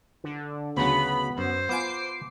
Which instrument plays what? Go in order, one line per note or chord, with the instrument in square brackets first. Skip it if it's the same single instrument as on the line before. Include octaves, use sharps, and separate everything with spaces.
[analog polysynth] D3
[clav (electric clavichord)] D2 C#3 F#3 [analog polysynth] B3 [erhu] B5
[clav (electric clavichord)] F#2 [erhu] C5
[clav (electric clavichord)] B3 F4 G#5 [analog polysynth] D6 C7